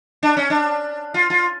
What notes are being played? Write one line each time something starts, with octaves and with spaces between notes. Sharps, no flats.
D4
C#4
D4
F4
F4